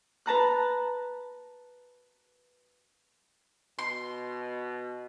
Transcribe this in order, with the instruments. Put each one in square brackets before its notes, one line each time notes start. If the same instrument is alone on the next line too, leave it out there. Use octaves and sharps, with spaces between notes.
[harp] B4 A5 A#5 F#6
[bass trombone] B2 [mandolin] C6